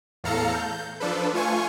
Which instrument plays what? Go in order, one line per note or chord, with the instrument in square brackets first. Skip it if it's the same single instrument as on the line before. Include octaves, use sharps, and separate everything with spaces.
[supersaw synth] E2 A2 A4 F5 A#5 C#7
G6
F3 D4 A4 B4
A3 F4 G#5 C#6